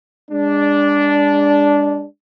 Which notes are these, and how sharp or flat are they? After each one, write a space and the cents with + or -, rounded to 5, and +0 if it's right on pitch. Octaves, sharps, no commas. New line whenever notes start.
G#3 -40 D4 -10